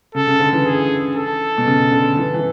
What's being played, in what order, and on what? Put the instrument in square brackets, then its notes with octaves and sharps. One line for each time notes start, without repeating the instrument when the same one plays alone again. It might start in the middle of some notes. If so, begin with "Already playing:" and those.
[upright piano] C#3 [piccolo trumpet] A4
[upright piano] C#3
D3
E3
[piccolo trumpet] G#4
A4
[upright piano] B2
C#3
D3
E3
E3